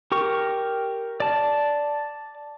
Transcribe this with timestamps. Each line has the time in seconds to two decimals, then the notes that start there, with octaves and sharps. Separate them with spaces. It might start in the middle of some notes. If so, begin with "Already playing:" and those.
0.12 G4 A#4 C#6
1.20 D5 A5